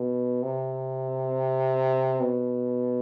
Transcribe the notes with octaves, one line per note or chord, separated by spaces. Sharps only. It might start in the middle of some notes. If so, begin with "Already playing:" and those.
Already playing: B2
C3
B2